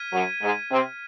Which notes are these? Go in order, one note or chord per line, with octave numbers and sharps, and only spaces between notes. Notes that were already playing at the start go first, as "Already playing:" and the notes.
Already playing: F6 G#6 B6 D#7
F#2 F#3
G#2 G#3
C3 C4